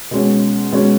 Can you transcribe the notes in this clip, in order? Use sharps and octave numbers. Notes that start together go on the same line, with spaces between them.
B2 G#3 C#4
B2 G#3 C#4